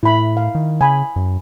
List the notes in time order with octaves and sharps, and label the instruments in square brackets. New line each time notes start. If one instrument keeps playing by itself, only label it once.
[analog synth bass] A2 [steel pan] E4 B5
[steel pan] F5
[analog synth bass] D#3
[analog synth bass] C#3 [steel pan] G#5 B5
[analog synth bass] F#2